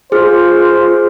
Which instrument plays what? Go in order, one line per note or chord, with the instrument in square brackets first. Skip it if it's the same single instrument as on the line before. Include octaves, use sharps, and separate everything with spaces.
[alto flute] F4 [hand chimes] G#4 F6 [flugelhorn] C5